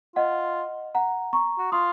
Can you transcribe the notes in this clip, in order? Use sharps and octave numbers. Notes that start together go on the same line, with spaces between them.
F4 D#5 F#5
F#5 A#5
A#5 C#6
F#4
F4 C6 D#6